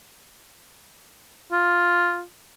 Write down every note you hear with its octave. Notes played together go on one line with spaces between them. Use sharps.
F4